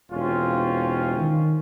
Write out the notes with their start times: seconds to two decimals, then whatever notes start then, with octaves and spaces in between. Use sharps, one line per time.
0.11 E1 C4 C#4 F4
1.18 D#3